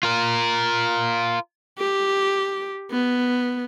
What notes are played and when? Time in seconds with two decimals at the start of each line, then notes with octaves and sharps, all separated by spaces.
0.03 F4 A#4
1.79 G4
2.91 B3